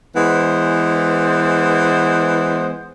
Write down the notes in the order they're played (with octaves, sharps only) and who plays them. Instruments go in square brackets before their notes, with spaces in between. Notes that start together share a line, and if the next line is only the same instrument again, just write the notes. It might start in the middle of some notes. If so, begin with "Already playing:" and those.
[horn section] E3 G#3 B3 C5